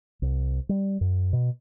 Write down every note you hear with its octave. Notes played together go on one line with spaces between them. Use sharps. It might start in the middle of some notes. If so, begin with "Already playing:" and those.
C2
G3
F#2
B2